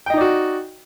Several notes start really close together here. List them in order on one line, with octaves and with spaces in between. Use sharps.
G5 D#5 D#4 D5 F#4